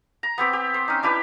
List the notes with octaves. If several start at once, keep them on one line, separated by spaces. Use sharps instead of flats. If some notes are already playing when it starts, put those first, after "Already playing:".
A#5
B3 C4 G4
G4
C5
C#4 D#4
D4 E4 G4 B4